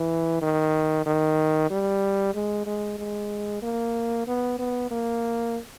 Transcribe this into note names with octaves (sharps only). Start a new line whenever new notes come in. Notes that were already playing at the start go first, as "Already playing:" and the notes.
Already playing: E3
D#3
D#3
G3
G#3
G#3
G#3
A#3
B3
B3
A#3